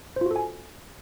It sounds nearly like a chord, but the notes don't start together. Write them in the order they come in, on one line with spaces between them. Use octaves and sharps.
C5 F4 F#4 A4 G#5